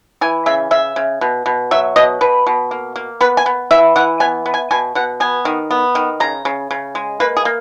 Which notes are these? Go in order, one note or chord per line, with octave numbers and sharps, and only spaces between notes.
E3 G#5
C#3 E5
C#3 E5
C#3
B2
B2
F#3 E5
B2 D#5
B2 B4
B2
A#3
A#3
B3 B4
G#5
B3
E3 E5
E3 F#5
B3 G#5
B3
G#5
B2 G#5
B2 F#5
B3 G#5
D#3
B3
D#3
C#3 A#5
C#3
C#3
G#3
A#3 B4
G#4
A#3